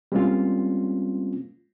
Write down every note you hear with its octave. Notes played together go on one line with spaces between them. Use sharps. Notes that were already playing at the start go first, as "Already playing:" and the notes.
G3 G#3 A#3 C4 C#4 F4